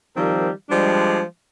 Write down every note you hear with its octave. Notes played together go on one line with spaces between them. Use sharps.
D#3 F3 G3 C4 A#4
F3 G3 G#3 D4